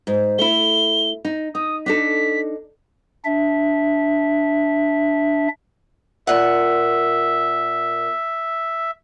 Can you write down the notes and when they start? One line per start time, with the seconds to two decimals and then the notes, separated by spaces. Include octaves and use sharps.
0.07 G#2
0.38 A3 E4 G7
1.25 D#4
1.55 D#4 D#6
1.86 D4 D#4 A4 B6
3.25 D4 E5
6.27 A#2 E5 F#5